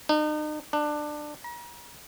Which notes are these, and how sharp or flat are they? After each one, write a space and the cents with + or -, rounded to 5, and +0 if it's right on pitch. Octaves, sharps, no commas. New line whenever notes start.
D#4 -40
D4 +20
A#5 +40